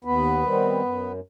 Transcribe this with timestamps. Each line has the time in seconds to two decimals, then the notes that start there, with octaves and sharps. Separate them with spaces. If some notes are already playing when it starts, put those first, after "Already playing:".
0.04 D#2 B3 B4
0.43 D#3 G3 C4
0.82 F#2